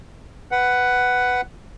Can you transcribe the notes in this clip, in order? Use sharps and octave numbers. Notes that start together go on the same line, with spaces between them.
B4 F#5